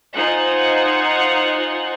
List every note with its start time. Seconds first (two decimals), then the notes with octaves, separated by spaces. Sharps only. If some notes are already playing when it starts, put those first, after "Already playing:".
0.14 D#4 F4 C5 F#5 G#5